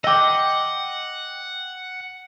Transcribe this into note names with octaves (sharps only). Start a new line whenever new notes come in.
D#5 F#5 G5 D6 E6